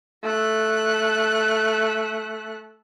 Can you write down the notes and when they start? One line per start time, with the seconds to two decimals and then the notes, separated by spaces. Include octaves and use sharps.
0.23 A3 F#6